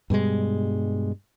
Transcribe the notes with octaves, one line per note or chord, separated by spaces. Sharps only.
G2 B2 G3 G#3